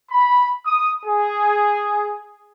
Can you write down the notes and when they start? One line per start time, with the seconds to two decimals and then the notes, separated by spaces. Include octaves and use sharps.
0.11 B5
0.65 D#6
1.06 G#4